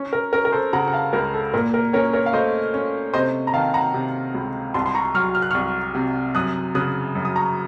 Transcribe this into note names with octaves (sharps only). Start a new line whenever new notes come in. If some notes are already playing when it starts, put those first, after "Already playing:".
Already playing: C#4
A#4
C#4 A#4
A#4
A4 C5
C#3 F#5 A#5
F#5
F5 A5
C#2 A#4
A4
A#2 A#4
A#4
C#4 A#4 C#5
A#4 C#5
F5
A3 C5 D#5
C#4
C3 C5 D#5
A#5
D#3 F5 A5
F#5 A#5
C3
C#2
C2 A5 C6
C6
A#5 C#6
F#3 C#6 F6
F6
F#6
C2 C#6 F6
C3
F#2 D#6 F#6
C#3 D#6 F#6
F#2
D#6
A#5 C#6